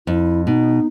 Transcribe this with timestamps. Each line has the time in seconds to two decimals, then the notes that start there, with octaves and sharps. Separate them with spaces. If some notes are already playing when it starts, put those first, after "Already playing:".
0.07 F2 E4
0.47 B2 D#4